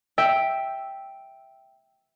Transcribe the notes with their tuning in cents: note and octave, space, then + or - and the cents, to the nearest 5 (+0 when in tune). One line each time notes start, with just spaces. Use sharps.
E5 -10 G5 +0 E6 +0